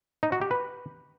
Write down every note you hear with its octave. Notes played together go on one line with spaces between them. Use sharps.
D#4
F#4
G4
B4